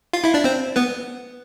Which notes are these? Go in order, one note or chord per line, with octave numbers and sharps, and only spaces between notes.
F4 F5
E4 E5
D4 D5
C4 C5
B3 B4